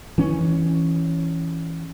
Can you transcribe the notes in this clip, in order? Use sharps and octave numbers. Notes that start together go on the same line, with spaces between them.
E3 C#4